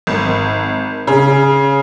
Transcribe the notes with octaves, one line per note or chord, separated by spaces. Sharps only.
G#1
C#3